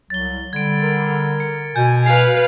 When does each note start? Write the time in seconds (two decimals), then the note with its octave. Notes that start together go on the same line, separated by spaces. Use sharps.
0.10 C2 F#3 A6 G7
0.53 D3 G3 G#6 D7
0.83 A#4
1.40 C#7
1.76 B2 G#5 G6
2.06 B4 F5 G#6 C7